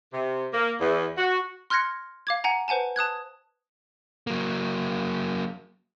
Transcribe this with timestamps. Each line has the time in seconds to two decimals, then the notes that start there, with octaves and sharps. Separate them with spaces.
0.13 C3
0.53 A#3
0.81 E2
1.17 F#4
1.70 C6 F6 F#6 G#6 A#6 C#7
2.27 F5 D6 G#6
2.44 F#5 G#5 A#5
2.68 B4 C5 F#5 G#5 A5
2.96 A5 D#6 F#6 G#6
4.27 F#3 A#3